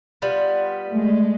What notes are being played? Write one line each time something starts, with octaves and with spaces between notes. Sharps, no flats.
G3 B3 F4
G#3 A3